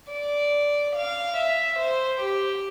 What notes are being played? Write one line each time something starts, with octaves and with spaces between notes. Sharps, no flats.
D5
F5
E5
C5
G4